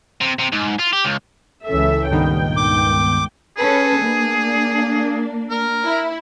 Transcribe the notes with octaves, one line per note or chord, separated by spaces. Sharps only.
C3
C3
G#2
F4
G4
C#2
C#2 E3 C#4 A4 E5
G2 A#2 D#3 B3 G5
C#2 D6
C#4 G#4 A4 B4
A#3 D4
A#4
E4